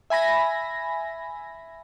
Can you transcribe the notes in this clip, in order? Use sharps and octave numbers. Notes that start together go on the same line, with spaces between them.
E5 G#5 B5 A#6